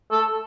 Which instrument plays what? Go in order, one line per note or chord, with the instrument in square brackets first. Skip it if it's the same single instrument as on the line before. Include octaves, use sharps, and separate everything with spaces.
[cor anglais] A4